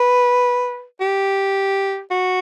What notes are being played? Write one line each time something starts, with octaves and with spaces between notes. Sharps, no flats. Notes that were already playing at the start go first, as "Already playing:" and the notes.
Already playing: B4
G4
F#4